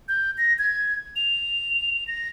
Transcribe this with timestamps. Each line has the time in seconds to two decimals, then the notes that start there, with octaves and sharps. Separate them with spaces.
0.08 G6
0.38 A#6
0.59 G#6
1.16 F7
2.07 A#6